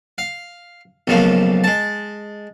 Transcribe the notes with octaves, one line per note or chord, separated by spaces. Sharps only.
F5
B1 C#3 F3 A3 A#3
G#3 A5